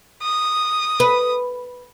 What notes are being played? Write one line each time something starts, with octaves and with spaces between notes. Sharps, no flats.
D#6
B4